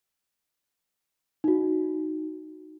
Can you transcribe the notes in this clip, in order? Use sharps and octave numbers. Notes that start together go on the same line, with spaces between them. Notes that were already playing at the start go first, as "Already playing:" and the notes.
D#4 F#4